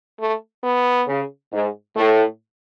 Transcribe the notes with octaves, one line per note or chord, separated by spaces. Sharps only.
A3
B3
C#3
G#2
A2 A3